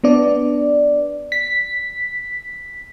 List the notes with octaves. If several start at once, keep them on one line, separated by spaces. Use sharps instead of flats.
B3 D4 D5
B6